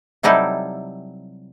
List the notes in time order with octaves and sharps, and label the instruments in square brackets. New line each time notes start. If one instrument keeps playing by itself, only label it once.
[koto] C3 F#3 G3 D#4 E4 A4